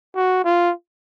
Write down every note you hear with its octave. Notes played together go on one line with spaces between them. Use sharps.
F#4
F4